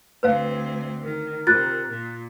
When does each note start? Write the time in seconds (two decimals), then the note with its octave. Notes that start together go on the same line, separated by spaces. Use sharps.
0.23 D2 C4 B4 C#5 F5
1.03 D#3 A#4
1.47 C3 F4 F#6 A6
1.90 A#2